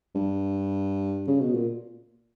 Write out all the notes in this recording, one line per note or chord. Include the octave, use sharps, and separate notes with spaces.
G2
C#3
B2
A#2